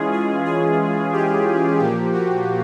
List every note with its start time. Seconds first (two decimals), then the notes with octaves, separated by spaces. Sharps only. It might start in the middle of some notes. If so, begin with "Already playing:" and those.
Already playing: E3 G#3 C#4 F4 G#4
0.12 G#4
0.45 G#4
1.12 G4
1.79 A#2 F3 A#3 G4
2.13 F#4